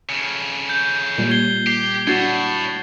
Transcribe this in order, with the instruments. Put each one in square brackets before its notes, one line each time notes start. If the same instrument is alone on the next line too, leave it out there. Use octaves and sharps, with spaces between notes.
[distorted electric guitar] F2 C#3
[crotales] G6
[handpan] A#2 G3
[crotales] G#6 C7 G7
[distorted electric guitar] G4 [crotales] C7
[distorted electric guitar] A2 [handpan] D4 F#4 [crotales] G#6 A6 C7